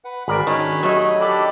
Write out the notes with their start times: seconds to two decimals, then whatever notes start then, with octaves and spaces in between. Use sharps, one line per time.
0.05 B4 F#5
0.28 G#1 F#4 G#4 A#4 D5 B5
0.47 D#3 C#4 D4
0.83 D#2 F#3 A3 D#5 G#5
1.20 D4 G4 A4 B5